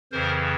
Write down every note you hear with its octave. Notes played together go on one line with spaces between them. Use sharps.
F2 C#3 E3 A#4 C5